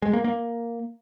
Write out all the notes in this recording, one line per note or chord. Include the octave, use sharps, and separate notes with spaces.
G#3
A#3
A#3